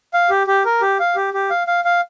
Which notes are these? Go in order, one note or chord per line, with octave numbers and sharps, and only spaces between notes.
F5
G4
G4
A#4
G4
F5
G4
G4
F5
F5
F5